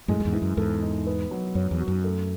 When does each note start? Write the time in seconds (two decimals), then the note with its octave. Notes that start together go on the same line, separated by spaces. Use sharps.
0.08 F#2 A2 G#3
0.20 F#2
0.25 E2 G#2
0.33 E3
0.42 F#2
0.57 E2 G#2 A4
0.82 D#4
1.07 B3
1.31 F#3
1.55 F#2 C#5
1.71 E2
1.80 F#4
1.88 F#2
2.04 A3